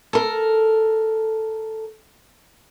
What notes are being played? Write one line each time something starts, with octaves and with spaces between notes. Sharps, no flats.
A4 A#4